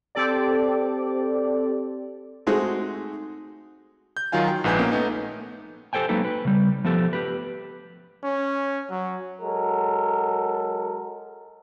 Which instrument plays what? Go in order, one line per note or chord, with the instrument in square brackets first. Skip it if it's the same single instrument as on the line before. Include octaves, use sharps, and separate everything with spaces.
[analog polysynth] C4 G4 A4 D5
[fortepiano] G#3 A3 C4 D#4 F#4 G#4
[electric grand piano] G6
D#3 F#3 F4 F5 G#5
G5
A#1 G#2 B4 G#5 G6
A#3 B3 C#4
A3 B3 D#4
[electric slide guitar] G4 A4 C5 G5 G#5
F#3 G#3 A#3 D#4 A4 B4
B4
C#3 G3
F3 A3 B3 G4 A4
G4 B4
[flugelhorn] C#4
F#3
[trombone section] F#3 G#3 A4 A#4